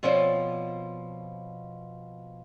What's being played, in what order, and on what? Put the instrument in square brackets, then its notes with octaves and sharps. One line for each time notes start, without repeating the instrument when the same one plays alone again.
[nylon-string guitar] B2 F3 C4 F4 C#5 D5